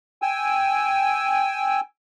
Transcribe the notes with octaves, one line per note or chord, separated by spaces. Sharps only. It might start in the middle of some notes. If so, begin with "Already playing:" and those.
G5 G#5 E6